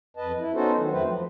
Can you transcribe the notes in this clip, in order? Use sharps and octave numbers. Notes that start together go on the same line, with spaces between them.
F2 B4 D#5 A5
E4
B3 C#4 D#4 F#4 A4 C5
D#3 F#3
F2 F#3 A3 C4 B4 C5
F3